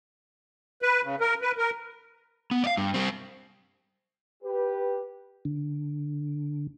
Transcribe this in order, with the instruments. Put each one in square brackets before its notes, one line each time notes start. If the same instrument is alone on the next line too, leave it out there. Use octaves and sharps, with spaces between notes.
[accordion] B4
C#3
A#4
B4
A#4
[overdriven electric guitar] B3
D5 F5
G2
G3 C4
[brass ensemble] G4 B4
[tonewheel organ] D3